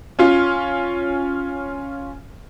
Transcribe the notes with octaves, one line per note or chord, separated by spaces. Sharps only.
C#4 F4